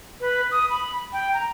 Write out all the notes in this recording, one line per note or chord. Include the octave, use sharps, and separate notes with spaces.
B4
D#6
B5
G5
A#5